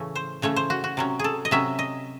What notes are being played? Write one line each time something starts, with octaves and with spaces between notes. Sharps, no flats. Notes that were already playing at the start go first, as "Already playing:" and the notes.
Already playing: A2 C#3 E3 A3 C#4
C5
C#3 E3 A3 C#4 C#5
C5
F#4
F#4
C3 F#3 C#4
G#4 A4
D#5
C3 F#3 C#4 E5
D#5